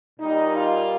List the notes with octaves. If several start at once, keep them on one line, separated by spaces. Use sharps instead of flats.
A#2 G3 A#3 D#4
F4